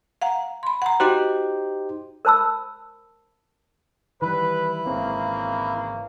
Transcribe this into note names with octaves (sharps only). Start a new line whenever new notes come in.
F5 F#5 A#5
B5 C6
F#5 A#5
D#4 F#4 G4 C5
A#4 C5 A5 B5 E6
D#3 E3 G3 E4 B4
G#1 C#3 E3 A#3 C4